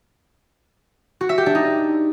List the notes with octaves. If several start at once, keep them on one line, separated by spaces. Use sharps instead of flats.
F#4
E5
G4
D4
D#4